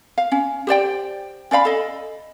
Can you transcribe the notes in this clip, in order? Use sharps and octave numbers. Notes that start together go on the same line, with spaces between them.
F5
C#4
G4 C5 D5 G5
C#4 D5 F5 B5
A4 D#5